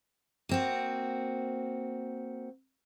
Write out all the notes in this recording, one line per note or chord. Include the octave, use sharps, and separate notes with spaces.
A#3 C4 F#4